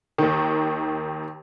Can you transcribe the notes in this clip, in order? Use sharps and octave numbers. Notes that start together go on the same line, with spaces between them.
D#2 D#3